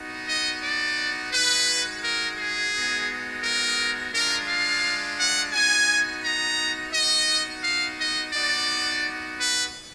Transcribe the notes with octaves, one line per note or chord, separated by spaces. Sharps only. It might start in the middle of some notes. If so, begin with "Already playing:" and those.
Already playing: B3 D#4 F#4
D#5
D5
G#3 D#4 F#4 B4
A#4
G#4
G#3 B3 D#4 F#4
A#4
G#3 D4 F4 A#4
F5
F#5
B3 D#4 F#4 G#5
A#5
B3 D#4 F#4 D#5
F5
D#5
B3 D#4 F#4 D5
B4